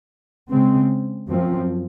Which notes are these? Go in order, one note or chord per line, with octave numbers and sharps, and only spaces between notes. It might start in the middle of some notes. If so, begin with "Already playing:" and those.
C#3 G#3 C4
F#2 F3 C4